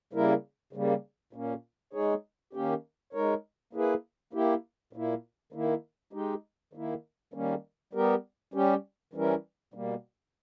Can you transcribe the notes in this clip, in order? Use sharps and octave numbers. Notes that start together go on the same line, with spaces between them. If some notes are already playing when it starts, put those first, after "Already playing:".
C#3 G3 A#3 E4 A#4
C#3 G3 A#3
A#2 A#3 C#4
G#3 D#4 G#4 C#5
D#3 A#3 C#4 G4
G#3 D#4 A#4 C#5
A#3 E4 G#4 B4
A#3 E4 G4
A#2 A#3 E4
D#3 A#3 E4
G#3 D#4 G4
D#3 A#3 E4
D#3 G3 A#3 C#4
G3 B3 G4 A#4
G3 C#4 G4
E3 G3 C#4 E4 A#4
B2 G3 A#3